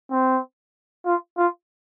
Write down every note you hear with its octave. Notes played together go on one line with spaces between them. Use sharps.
C4
F4
F4